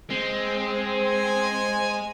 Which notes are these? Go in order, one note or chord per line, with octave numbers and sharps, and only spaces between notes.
G#3 C4
C5 G#5